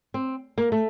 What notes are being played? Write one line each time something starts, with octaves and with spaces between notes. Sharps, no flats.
C4
A#3
A3